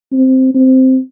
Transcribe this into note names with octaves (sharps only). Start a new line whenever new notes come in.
C4
C4